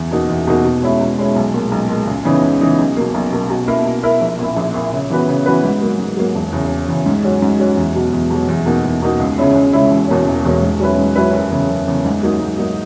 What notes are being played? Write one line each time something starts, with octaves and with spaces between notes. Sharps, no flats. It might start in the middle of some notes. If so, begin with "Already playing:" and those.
Already playing: E2
B2 A#3 D#4 F#4
E2
B2 A#3 D#4 F#4
B2
G#3 C#4 E4
B2
G#3 C#4 E4
B1
A#2 G#3
B1
A#2 G#3
C#2
C#3 E3 B3 D#4
C#2
C#3 E3 B3 D#4
B1
B2 A#3
B1
B2 A#3
B2
A#3 E4 A#4
B2
A#3 E4 A#4
A#1
A#2 A#3 E4
A#1
A#2 A#3 E4
C#3
E3 B3 F#4 B4
C#3
E3 B3 F#4 B4
G#2
F#3 A#3
G#2
F#3 A#3
E1
E2 C#3
E1
E2 C#3
G#2
F#3 C#4 F#4
G#2
F#3 C#4 F#4
E2
B2 F#3
E2
B2 F#3
E2
B2 A#3 D#4 F#4
E2
B2 A#3 D#4 F#4
C#2
C#3 G#3 C#4 E4
C#2
C#3 G#3 C#4 E4
E1
E2 B2 A#3 C#4
E1
E2 B2 A#3 C#4
G#2
F#3 C#4 E4 B4
G#2
F#3 C#4 E4 B4
F#1
E2 C#3
F#1
E2 C#3
G#2
F#3 A#3 D#4
G#2
F#3 A#3 D#4